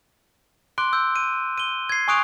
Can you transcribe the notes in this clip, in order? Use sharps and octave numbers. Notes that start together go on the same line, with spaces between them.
C6 D6 F#6 D7 G7
E6 G6
D#7
D#7 G7
G#6 C7
G#5 C#6 D#6 F#6 D7 F7